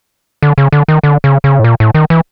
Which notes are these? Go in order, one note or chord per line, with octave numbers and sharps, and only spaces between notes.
D3
C#3
D3
D#3
D3
C#3
C#3
A2
A#2
A2
D#3
E3